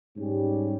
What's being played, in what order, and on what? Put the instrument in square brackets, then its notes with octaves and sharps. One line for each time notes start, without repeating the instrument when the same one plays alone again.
[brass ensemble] G#2 G3 C#4 G4